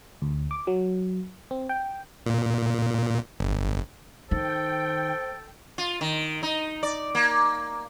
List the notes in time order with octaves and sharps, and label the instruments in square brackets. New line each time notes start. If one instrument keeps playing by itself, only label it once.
[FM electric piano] D2
D6
F#3
C4
G5
[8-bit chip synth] A#2
G1
[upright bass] D#3 [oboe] A4 [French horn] C5 [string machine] G5
[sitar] F4
D#3
D#4
D5
A#3